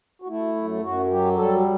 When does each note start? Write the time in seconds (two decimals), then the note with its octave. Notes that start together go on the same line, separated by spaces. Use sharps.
0.22 F#4
0.28 A3 E4
0.55 F#2
0.82 F#2 F#4
1.10 F#3 G4
1.36 G3 A4